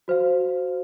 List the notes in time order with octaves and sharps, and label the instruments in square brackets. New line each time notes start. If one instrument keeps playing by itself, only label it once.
[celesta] F#4 C5 F5